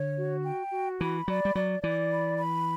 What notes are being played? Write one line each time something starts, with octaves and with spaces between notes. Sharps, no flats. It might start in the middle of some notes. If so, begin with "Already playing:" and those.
Already playing: D3 C#5
F#4
G5
F#4
E3 B5
F#3 D5
G3
F#3 D5
E3 D5
B5
B5